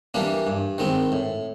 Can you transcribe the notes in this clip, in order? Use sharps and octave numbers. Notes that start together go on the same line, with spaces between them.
E3 G3 A#3 D4
G2
D#3 G#3 C4
A2